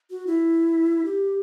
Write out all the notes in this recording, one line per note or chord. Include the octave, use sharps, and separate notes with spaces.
F#4
E4
G4